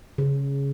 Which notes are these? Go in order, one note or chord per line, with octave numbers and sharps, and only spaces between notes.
C#3